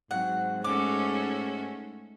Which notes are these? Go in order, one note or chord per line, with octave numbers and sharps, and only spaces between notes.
G#2 F#3 C4 F#5
G#3 A3 C#4 F#4 A4 D6